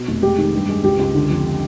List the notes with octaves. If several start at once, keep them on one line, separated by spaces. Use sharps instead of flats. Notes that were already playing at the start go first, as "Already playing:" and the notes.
Already playing: B2
F1
G#3 G4
D#3
G2
G#3
C#2 G4
C#2
D3
F2